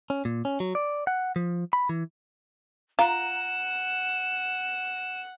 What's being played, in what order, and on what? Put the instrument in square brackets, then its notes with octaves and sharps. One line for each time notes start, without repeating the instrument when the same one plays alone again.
[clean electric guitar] C#4
A#2
C#4
F#3
D5
F#5
F3
B5
E3
[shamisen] F4 [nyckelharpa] F#5 [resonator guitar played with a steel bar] A#5 [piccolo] E7